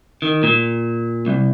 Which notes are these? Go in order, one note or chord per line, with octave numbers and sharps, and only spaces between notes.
D#3
A#2
C2